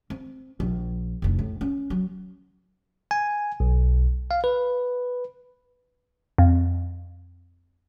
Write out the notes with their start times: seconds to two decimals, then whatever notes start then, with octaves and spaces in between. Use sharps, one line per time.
0.10 C4
0.60 A#1
1.22 F1 D2
1.39 A2
1.61 C#4
1.90 F#3
3.11 G#5
3.60 B1
4.31 F5
4.44 B4
6.38 F2